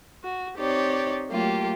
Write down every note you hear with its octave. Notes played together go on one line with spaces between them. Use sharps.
F#4
C4 D#4 G4 C#5 D5
F#3 A3 A#3 F4 G4